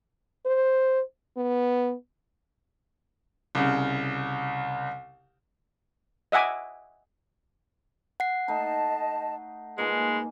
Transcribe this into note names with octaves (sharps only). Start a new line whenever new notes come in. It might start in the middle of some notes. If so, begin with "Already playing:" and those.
C5
B3
C2 C#3
D#5 E5 F#5 G#5 D6
F#5 C7
A3 D#4 D#5 A5
A#2 G#3 D#4 B4 G#5